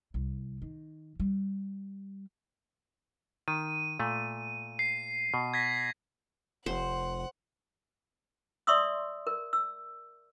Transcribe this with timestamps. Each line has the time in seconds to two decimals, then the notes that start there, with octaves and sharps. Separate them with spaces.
0.14 C2
0.62 D#3
1.20 G3
3.48 D#3 D#7
3.99 A#2 A3
4.79 C7
5.34 B2
5.54 G#6 A#6 B6
6.66 F1 C5 F#5
8.67 D5 E5 C6 C#6 D#6 E6
9.27 A#4
9.53 E6